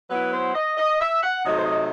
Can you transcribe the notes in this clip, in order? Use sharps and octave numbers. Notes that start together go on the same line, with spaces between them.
F#3 B3 E4 B4
C5
D#5
D#5
E5
F#5
C3 F#3 A3 D#4 D#5
C5
D#5